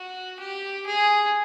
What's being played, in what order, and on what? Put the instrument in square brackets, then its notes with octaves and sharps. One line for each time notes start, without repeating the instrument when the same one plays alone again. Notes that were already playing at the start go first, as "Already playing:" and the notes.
Already playing: [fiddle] F#4
G4
G#4